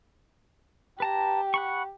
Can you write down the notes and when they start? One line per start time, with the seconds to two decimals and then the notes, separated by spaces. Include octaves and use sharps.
1.00 G4 B4 A5 A#5
1.54 F#5 B5 C#6